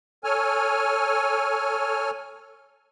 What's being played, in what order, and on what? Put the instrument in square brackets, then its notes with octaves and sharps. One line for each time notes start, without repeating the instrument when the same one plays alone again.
[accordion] A4 C#5 G#5 F6